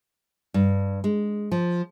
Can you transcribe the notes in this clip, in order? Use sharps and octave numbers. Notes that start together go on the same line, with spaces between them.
G2
G#3
F3